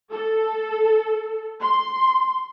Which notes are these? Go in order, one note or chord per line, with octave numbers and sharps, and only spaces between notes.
A4
C6